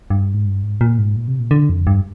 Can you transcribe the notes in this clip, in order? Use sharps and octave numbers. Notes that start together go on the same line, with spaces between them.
G2
G#2
G2
G#2
A#2
G#2
A#2
C3
A#2
D3
F2
G2